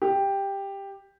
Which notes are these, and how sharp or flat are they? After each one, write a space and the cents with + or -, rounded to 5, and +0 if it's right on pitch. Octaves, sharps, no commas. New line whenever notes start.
G4 +5